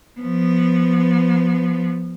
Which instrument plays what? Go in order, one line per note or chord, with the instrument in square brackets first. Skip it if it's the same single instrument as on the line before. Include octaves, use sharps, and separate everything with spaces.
[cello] F3 B3